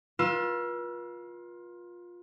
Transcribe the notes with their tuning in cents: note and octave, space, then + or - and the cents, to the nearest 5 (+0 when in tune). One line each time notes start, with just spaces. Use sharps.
F4 +15 B4 -45 E6 +20